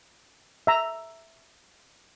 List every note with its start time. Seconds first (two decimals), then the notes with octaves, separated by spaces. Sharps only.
0.67 E5 A#5